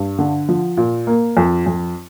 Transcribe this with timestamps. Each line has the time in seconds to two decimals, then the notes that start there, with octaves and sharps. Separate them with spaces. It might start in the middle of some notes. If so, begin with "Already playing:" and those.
Already playing: G2
0.19 D3
0.49 F3
0.77 A#2
1.07 A#3
1.37 F2
1.66 F2